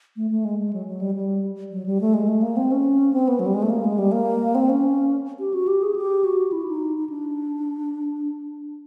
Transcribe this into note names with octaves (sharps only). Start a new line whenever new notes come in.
A3
A3
G#3
G#3
F#3
F#3
G3
G3
F#3
G3
A3
G#3
A3
A#3
C4
C#4
C4
B3
F#3
G3
G#3
A3
A#3
G#3
G3
A#3
C4
C#4
G4
F#4
G4
G#4
G4
F#4
E4
D#4
D#4
D4